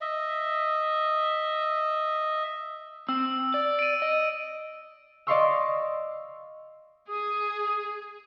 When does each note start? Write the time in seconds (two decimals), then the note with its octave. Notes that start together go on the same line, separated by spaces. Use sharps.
0.01 D#5 E5
3.09 C4 E6
3.54 D5
3.79 D7 D#7
4.02 D#5
5.27 D5 D#5 F5 C6 C#6 E6
7.09 G#4 D#6